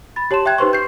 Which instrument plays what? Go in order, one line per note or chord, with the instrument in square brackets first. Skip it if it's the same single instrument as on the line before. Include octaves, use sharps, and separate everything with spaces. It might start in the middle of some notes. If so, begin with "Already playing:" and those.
[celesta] B5 A6
G4 C#5 A5 C6 E7
E5 G5 F#6 G#6
D#4 G4 B4 C5 C6 C#6
G6 C7